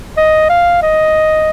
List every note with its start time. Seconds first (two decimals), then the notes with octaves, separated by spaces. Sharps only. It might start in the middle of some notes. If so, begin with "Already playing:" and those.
0.17 D#5
0.49 F5
0.83 D#5